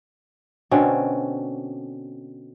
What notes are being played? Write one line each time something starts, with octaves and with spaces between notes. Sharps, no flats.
B2 D3 C4 C#4